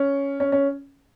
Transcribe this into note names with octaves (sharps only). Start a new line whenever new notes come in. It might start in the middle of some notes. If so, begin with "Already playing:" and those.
Already playing: C#4
C#4
C#4